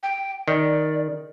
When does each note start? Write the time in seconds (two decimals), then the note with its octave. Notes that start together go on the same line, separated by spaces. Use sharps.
0.03 G5
0.48 D#3 D5